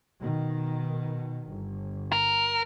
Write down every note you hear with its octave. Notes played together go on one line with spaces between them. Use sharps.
B2 D#3
G1
A#4